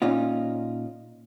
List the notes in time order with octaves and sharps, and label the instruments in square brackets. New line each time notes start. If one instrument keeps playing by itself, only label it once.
[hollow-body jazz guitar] A#2 C#4 D#4 F4